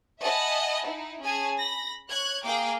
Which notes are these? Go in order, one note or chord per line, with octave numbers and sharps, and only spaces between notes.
D#5 E5 F#5 G#5 A5 B5
D#4 E4
C#4 G#4 G#5 A5
B5 A#6
C#5 F#6 G#6
A#3 G#4 F5 G5 D6